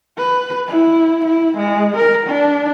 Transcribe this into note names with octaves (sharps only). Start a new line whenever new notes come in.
B4
E4
E4
G#3
A#4
D4